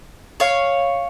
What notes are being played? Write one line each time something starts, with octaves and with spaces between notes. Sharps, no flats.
C#5 F5